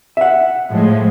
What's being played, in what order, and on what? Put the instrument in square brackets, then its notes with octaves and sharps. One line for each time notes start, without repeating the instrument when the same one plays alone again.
[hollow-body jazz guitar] E5 F#5
[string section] A2 F3 G#3